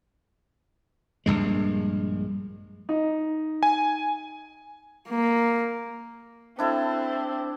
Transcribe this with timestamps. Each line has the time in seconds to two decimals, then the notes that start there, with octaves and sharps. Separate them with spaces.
1.26 A#1 E2 G2 G#3
2.89 D#4
3.63 G#5
5.10 A#3
6.59 C4 D4 E4 A4